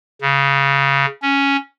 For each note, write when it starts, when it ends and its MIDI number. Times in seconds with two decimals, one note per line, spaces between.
0.21 1.06 49
1.22 1.56 61